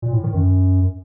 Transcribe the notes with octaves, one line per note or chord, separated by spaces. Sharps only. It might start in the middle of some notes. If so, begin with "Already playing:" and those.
A#2
A2
D#3
F#2